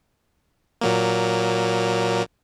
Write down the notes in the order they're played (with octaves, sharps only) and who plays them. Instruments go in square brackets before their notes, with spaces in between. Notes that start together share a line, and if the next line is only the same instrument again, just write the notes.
[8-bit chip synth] A#2 F#3 A#3